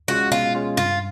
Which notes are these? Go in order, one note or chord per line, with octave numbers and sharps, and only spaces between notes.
G#3 C#4 F4 F#4
B2 F4
G#3 C#4 F4
G2 F4